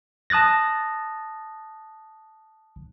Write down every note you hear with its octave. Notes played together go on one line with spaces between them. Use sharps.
A5 D#6 F#6 A6 A#6